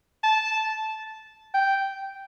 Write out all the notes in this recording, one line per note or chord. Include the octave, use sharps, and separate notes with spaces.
A5
G5